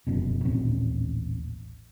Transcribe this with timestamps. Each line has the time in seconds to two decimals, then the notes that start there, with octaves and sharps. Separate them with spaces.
0.07 F1 F#2 B2
0.45 A1 D#2 A#2 C4